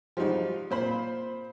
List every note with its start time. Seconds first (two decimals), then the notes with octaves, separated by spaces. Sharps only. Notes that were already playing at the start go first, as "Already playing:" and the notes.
0.17 F3 G3 G#3 D#4 F#4
0.71 A#2 C5 B5